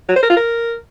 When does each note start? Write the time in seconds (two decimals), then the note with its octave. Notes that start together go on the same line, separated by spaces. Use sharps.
0.09 F#3
0.16 C5
0.23 A#4
0.30 F4
0.37 A#4